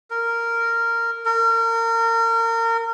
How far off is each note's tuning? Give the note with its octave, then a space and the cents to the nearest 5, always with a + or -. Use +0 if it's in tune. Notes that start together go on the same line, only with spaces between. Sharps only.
A#4 -10
A#4 -30